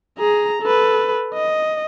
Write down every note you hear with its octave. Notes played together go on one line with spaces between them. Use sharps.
G#4 A#5
A4 B4
D#5